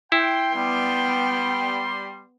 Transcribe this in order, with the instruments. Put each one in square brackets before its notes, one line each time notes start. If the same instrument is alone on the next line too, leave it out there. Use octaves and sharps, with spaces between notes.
[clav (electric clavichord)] E4 [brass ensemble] G5 [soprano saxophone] C6
[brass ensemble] G3 [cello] B3 G5